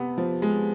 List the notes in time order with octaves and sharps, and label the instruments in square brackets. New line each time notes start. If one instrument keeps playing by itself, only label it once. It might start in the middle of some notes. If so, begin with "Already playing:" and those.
Already playing: [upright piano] C3 B3
F3
G#3